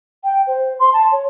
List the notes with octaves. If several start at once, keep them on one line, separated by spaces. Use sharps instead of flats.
G5
C5
C6
A5
C#5